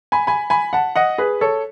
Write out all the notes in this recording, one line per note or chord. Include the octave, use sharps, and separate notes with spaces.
G#5 B5
G#5 B5
G#5 B5
F#5 A5
D#5 F#5
G#4 B4
A4 C#5